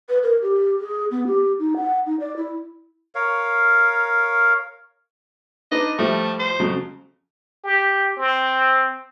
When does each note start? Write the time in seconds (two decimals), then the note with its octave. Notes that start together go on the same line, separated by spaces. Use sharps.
0.09 B4
0.23 A#4
0.42 G4
0.80 G#4
1.11 B3
1.27 G4
1.59 D#4
1.77 F#5
2.06 D#4
2.20 D5
2.37 E4
3.15 A#4 C#5 F5
5.71 D4 D#4 B4 D#5
5.99 A2 F3 G3 A3
6.40 C5
6.60 F2 C#3 F#3
7.64 G4
8.17 C4